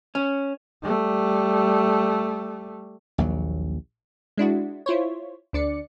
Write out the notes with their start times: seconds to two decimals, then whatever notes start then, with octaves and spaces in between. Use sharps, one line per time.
0.15 C#4
0.83 G3 A3
3.18 A#1 D#2 F#3
4.38 G#3 D4 E4 F#4
4.86 E4 F4 C5 C#5
5.53 D2 D4 D5 C#7